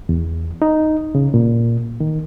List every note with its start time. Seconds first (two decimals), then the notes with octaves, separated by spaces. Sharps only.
0.09 E2
0.62 D#4
1.15 C#3
1.34 A#2
2.00 D#3